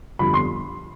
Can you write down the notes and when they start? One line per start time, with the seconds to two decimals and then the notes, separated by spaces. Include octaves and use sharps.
0.19 G1 F2 D3 G3 B5
0.34 C6